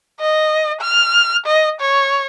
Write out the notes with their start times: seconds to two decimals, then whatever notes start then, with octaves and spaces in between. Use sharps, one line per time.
0.20 D#5
0.81 F6
1.46 D#5
1.81 C#5